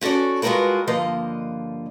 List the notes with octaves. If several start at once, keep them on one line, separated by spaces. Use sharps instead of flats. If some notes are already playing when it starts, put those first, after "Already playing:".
C#4 F#4 A4 C#5 D5
G3 G#3 F4 F#4 A#4 B4
G2 D3 F3 A#3 D#5